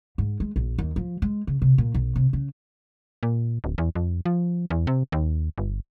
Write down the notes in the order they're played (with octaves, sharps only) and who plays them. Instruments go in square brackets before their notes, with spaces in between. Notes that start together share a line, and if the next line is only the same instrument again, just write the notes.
[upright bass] G#2
G#3
A#1
D#2
F3
G#3
C#3
C3
A#2
B1
C3
C#3
[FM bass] A#2
D1
E2
F2
F3
E2
C3
D#2
G1